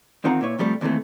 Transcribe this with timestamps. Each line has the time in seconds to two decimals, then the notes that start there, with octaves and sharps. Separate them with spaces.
0.24 E2 D#3 C4 F4 F#5 A#5
0.41 A#2 E4 B4 C#5
0.59 C3 F3 G3 A3
0.81 D#2 C3 D#3 E3 A3